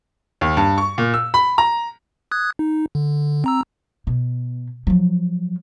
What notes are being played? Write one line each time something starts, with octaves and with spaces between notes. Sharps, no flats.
D#2
G2
C#6
A#2
E6
B5
A#5
D#6 F#6 G#6
D#4
D3
C4 A#5 E6
B2
F3 F#3